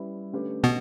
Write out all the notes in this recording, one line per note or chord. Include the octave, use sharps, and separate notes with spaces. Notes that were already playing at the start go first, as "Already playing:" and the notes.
Already playing: G3 C#4 E4 B4
D3 A3 C#4 G4 B4
B2 B3